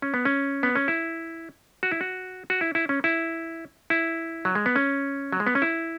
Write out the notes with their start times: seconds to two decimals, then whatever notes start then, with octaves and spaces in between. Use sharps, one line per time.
0.02 C#4
0.14 B3
0.25 C#4
0.63 B3
0.75 C#4
0.88 E4
1.83 F#4
1.92 E4
2.01 F#4
2.50 F#4
2.61 E4
2.75 E4
2.89 C#4
3.04 E4
3.90 E4
4.45 F#3
4.55 G#3
4.66 B3
4.76 C#4
5.32 F#3
5.40 G#3
5.47 B3
5.55 C#4
5.62 E4